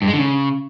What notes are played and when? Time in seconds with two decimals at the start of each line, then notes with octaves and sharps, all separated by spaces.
0.02 G2
0.08 G#3
0.13 D3
0.19 C#3